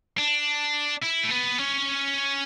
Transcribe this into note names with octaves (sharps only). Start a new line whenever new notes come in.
D4
E4
A3
B3
C#4